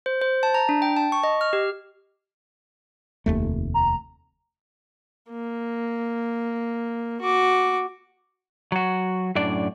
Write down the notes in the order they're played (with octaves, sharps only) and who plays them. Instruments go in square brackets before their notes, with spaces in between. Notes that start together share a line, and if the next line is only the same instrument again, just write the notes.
[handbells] C5
C5
A5
A#5
D4
G5
A5
C#6
D#5
F6
G4
[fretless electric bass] F1 D#2 A3
[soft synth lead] A#5
[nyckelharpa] A#3
F#4 D6
[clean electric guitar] F#3 F#4
F#2 A2 D4 D5